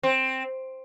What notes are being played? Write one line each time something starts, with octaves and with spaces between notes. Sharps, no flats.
C4